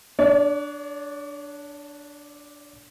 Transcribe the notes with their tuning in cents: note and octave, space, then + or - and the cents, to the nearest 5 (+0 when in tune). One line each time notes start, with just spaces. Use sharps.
D4 +0 C#5 +40